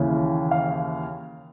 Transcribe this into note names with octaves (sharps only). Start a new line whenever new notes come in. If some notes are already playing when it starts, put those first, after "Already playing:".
Already playing: D#2 C#3 E3
F5